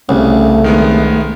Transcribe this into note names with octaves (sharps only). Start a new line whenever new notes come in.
C2 C#3 A3
D#3 G#3 B3